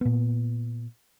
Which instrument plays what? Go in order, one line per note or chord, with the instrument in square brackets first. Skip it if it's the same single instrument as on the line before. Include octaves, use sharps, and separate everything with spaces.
[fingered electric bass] A#2 B3